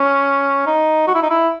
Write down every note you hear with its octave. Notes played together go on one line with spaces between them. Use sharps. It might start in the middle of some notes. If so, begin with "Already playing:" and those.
Already playing: C#4
D#4
F#4
E4
D#4
E4